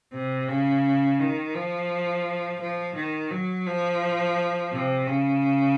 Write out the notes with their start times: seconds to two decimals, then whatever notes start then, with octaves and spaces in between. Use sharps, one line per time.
0.14 C3
0.49 C#3
1.20 D#3
1.55 F3
2.60 F3
2.95 D#3
3.31 F#3
3.66 F3
4.72 C3
5.07 C#3